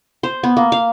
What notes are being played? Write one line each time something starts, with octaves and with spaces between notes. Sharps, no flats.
C5
B3
A#3
F5